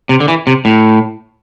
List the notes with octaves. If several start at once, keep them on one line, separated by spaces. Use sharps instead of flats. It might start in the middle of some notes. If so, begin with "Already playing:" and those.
C3
D3
E3
C3
A2